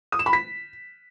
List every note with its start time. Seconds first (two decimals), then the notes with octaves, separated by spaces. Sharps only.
0.12 D#6
0.19 E7
0.26 B5
0.33 B6